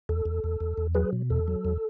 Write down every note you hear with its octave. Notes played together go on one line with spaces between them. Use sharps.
E2 A4
E2
E2
E2
E2
F#3 G#4 B4
B2
E2 A4
F#3
E2